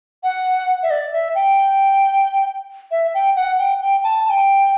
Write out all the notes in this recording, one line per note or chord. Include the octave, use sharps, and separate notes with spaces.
F#5
E5
D5
E5
G5
E5
G5
F#5
G5
G5
A5
A5
G5